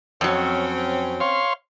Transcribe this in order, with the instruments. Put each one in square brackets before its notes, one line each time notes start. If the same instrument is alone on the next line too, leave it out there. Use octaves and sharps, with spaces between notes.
[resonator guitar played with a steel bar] F2 F#3 [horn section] C4 C#4
[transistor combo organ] C#5 F5 C6